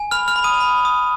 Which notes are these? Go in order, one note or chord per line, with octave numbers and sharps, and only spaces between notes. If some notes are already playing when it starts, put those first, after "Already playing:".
Already playing: G#5
B5 F6 F7
F6 F7
B5
D#6 D#7
B5
D#6